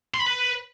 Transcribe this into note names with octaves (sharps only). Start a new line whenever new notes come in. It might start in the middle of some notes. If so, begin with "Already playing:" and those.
C6
B5
B4